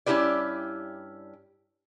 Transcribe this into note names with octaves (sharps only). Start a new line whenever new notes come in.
G2 C#4 E4 G4 B4 D5